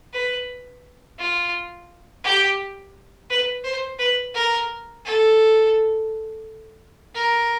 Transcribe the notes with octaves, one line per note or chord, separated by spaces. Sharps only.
B4
F4
G4
B4
C5
B4
A#4
A4
A#4